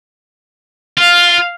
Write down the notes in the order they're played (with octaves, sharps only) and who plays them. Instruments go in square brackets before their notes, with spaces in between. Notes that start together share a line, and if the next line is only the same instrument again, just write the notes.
[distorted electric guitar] F4 [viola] F5